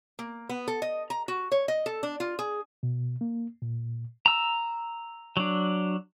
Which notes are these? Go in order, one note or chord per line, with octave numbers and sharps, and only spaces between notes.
A#3
B3
A4
D#5
A#5
F#4
C#5
D#5
A4
D4
F4
G#4
B2
A#3
A#2
A#5 E6
F#3 D4